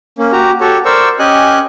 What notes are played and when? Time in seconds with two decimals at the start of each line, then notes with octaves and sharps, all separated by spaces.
0.18 A#3 C#4
0.33 F#4 G4 A#5
0.61 F#4 G4 A4 C#5
0.85 A#4 C5 D5 C#6 E6
1.19 C#4 G4 D#5 G#5 F#6